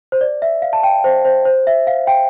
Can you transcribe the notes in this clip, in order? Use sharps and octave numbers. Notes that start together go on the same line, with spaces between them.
C5
D5
E5
F5
A5
G5
C5
C5
C5
E5
F5
G5